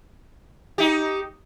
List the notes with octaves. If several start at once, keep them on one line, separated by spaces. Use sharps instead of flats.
D#4 G4